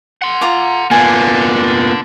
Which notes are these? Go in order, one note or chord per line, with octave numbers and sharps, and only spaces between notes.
F#5 C6
F4 A#5 D6
D3 A#3 B3 F4 G#5